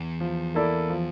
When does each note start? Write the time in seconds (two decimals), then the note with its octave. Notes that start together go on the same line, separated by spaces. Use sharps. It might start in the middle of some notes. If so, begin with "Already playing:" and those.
Already playing: E2
0.20 F3
0.55 A#3 E4 A4 D5
0.90 F3